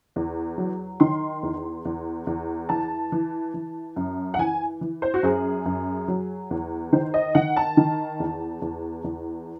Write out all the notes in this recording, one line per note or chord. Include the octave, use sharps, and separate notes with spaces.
E2
F#3
D#3 C6
E2
E2
E2
E3 A5
E3
E3
F#2
F#5
E3 G#5
E3
C5
F#4
F#2 G#4
F#2
F#3
E2
D#3 C5
D#5
D#3 F#5
A5
D#3
E2
E2
E2